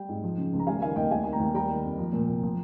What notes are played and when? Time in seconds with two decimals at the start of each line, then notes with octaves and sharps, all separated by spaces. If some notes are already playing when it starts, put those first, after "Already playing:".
Already playing: G3 G5
0.09 G#2
0.24 F3
0.37 C#3
0.53 C#2
0.59 A#5
0.67 G3 F5 G#5
0.81 D#3 F5 G#5
0.96 D#2 D#5 G5
1.11 G3 F5 G#5
1.24 D#3 G#5
1.33 G5 A#5
1.40 D#2
1.54 G3 G5 A#5
1.69 D#3
1.84 F2
1.98 F3
2.13 A#2
2.28 C2
2.43 F3